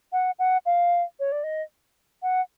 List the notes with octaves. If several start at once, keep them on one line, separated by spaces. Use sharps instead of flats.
F#5
F#5
F5
C#5
D5
D#5
F#5